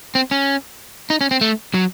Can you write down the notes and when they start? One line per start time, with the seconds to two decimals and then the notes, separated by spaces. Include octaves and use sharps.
0.15 C4
0.31 C#4
1.10 D#4
1.21 C#4
1.31 C4
1.41 A3
1.74 F#3